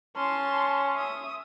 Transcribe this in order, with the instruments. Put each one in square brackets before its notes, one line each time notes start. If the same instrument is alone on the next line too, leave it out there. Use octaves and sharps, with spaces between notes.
[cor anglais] C#4 [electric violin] A5 C6
[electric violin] E5 D#6